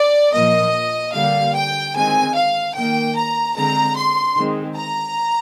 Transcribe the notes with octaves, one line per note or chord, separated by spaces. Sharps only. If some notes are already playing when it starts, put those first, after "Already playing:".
Already playing: D5
A#2 F3 A#3 D#5
D3 G3 A#3 F5
G5
D#3 G#3 C4 G#5
F5
D#3 A#3 G5
A#5
D3 G#3 C4 A#5
C6
D#3 G#3 C4
A#5